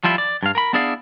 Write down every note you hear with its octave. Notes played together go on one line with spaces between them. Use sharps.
F3 G3 E4 F4
D5
G2 F5
A#4 B5
B3 D4 E4 G#4 D5 F5